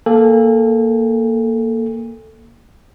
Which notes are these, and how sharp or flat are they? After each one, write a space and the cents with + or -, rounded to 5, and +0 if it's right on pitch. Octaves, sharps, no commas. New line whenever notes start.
A#3 +0 A4 +0 G#5 -40